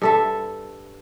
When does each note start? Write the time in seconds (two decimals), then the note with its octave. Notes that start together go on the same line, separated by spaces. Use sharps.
0.02 G2 A4 E5